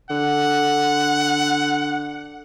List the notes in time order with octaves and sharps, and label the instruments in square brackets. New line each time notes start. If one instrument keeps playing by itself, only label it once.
[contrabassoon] D3 [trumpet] F#5